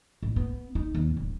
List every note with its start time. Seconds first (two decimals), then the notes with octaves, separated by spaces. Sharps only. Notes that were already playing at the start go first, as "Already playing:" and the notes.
0.23 A1
0.36 B3
0.75 D#4
0.95 D#2
1.17 D1